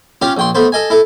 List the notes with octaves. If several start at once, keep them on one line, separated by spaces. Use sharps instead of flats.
C#4 F4 G4 F5
A#1 G5 C6
A3 B3 C5
A4 D#5 G#5
E4 A4